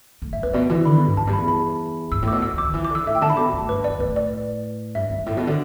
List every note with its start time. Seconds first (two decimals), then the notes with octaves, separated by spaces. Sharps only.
0.22 A2
0.33 G2 E5
0.43 G2 B4
0.53 B2 D5
0.69 E3
0.85 D3 B5
0.95 B2
1.06 G2
1.16 E2 A5
1.27 G2
1.33 E2 B5
1.48 B5
2.11 G2 E6
2.22 A2
2.28 B2 D6
2.42 E6
2.54 E3 D6
2.64 D3
2.74 E3
2.85 D6
2.90 D3
2.95 E6
3.06 A2 E5
3.15 G5
3.21 D3 A5
3.30 B5
3.37 B2 D6
3.53 A2
3.69 G2 B4
3.80 E2
3.84 D5
3.90 E2
4.00 A2 B4
4.16 D5
4.95 G2 E5
5.10 G2
5.26 A2
5.37 B2
5.47 D3